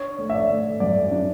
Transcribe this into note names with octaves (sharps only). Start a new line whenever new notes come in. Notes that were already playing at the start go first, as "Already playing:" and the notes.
Already playing: D4 C#5
A3
E5
D5
A3
F#2 D5
D4